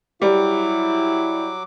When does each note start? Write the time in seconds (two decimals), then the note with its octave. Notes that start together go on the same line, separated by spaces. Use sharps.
0.22 F#3 G3 E4 D6